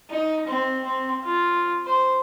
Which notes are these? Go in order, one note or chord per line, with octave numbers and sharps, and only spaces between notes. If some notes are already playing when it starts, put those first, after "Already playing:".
D#4
C4
C4
F4
C5